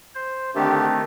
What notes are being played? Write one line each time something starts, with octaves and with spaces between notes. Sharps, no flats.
C5
D3 D#3 A3 C4 D4 G4